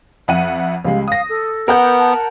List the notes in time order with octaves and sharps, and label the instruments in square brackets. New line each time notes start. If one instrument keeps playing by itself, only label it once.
[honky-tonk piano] F2 F#5 D#7 [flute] E5
[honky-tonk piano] C#2 G3 G#3 [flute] F5
[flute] F5 [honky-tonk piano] D#6 A#6
[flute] A4
[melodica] B3 [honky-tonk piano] A#4 F#5 G6
[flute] A5